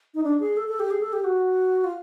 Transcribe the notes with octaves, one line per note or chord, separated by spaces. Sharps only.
D#4
D4
G#4
A4
A4
G4
G#4
A4
G4
F#4
F4